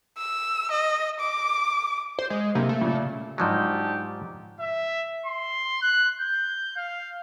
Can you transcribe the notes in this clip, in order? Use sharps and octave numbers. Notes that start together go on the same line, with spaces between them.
E6
D#5
D6
C5
G#3
C3 A#3
A3
A#2 C#3
G#2 F3 F#3 D4 D#4 G4
E5
C6
F#6
G6
F5